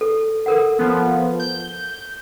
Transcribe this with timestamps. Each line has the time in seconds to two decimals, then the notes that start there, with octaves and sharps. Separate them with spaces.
0.01 A4
0.46 A4 A#4 F#5
0.79 F3 B3
1.39 G6